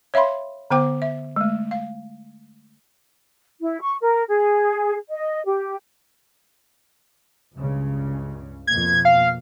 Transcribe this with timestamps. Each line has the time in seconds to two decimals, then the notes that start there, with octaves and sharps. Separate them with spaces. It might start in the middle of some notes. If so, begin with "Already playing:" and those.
0.14 C#5 E5 F5 B5 C6
0.70 D3 B3 C5 G5 D6
1.02 E5
1.36 G#3 A3
1.71 F5
3.61 E4
3.81 C#6
4.01 A#4
4.28 G#4
5.09 D#5
5.46 G4
7.56 C#2 G2 C#3
8.67 F2 B2 A#3 G#6
9.05 F5